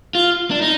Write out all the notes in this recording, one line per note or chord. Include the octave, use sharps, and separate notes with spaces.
F4
D4
D#4